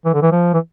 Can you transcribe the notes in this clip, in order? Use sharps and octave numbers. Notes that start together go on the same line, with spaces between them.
E3
D3
E3
F3
E3